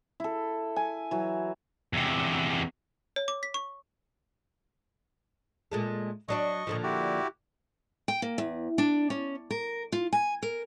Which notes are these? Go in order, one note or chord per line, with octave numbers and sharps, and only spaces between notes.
E4 A4
G#5
E3 F#3
E2 C3
C#5
D6
B6
C#6
A#2 G#3 A3
F#3 D4 F#4 D#5 C#6
A#2 D3 F3
E4 F#4 G4
G5
A#3
E2
D4
C#4
A#4
F4
G#5
A#4